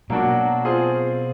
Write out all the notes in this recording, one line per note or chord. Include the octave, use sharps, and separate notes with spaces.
B2 F#3 A#3 D4 F#4
C4 F4 G#4